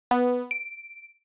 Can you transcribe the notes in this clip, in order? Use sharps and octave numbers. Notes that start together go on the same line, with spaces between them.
B3
D7